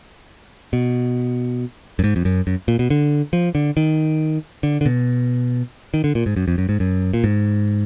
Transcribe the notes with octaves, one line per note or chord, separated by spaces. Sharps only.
B2
F#2
G#2
F2
F#2
F#2
A#2
B2
D3
F3
D3
D#3
D3
D3
B2
D#3
D3
A#2
G#2
F#2
F2
F#2
G#2
F#2
A#2
G#2